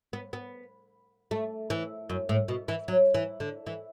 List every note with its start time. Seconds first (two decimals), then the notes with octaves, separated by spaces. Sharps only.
0.13 B3
0.33 B3
1.31 A3
1.70 E3
2.10 F#2
2.29 A2
2.48 B2
2.68 E3
2.88 F#3
3.14 E3
3.40 D3
3.67 E3